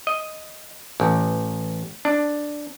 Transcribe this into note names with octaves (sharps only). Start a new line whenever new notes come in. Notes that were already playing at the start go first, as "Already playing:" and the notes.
D#5
A1
D4